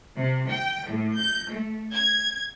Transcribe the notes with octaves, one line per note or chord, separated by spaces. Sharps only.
C3
G5
A2
G6
A3
G#6